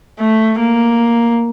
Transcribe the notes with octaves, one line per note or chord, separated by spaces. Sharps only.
A3
A#3